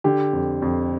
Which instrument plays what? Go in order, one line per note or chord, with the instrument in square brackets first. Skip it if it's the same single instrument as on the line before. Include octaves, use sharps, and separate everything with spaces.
[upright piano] D3 G4
F2
F2